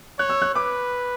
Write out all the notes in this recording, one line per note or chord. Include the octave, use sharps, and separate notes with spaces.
C#5 F#6
E6
F#6
B4 D6